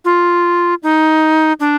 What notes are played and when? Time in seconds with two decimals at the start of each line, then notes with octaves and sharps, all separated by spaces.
0.05 F4
0.83 D#4
1.60 D4